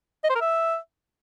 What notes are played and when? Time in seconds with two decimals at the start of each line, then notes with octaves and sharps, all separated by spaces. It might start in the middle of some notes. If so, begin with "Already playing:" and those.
0.24 D#5
0.30 C5
0.35 A#4
0.41 E5